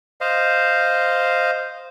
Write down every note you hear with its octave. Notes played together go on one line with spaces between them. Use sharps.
C5 D#5 F5